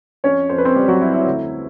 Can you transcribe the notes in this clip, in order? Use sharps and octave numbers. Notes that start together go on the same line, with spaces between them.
F2 C#4 C#5
F2 C5
B4
C4 C5
F2 G3 G4
F#3 F#4
F2 E4
E4
D2